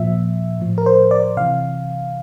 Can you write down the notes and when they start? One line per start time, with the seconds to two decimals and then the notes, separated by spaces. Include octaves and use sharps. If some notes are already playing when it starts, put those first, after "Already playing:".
Already playing: A#2 F3 E5
0.60 A2 F3
0.78 A#4
0.86 C5
1.11 D5
1.37 C3 E3 F5